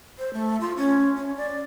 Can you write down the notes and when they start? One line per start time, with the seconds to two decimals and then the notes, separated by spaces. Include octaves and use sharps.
0.19 C5
0.34 A3
0.60 F4
0.77 C#4
1.16 C#4
1.37 D5